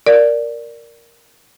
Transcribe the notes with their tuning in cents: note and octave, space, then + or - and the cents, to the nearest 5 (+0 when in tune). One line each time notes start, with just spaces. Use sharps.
A#4 +0 D5 +0